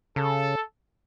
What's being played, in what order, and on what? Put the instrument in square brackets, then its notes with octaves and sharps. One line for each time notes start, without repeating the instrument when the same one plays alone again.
[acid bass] C#3 [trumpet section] A4